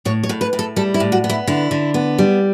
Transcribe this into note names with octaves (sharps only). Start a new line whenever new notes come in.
A2 C#5
C#5
A2
B4
A2
A4
G3 A4
E4
A2
F#4
B3
E4
D3 E4
D3
B3
G3